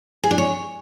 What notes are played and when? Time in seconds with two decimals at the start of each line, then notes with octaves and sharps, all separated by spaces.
0.23 G#4
0.31 D4
0.38 C#5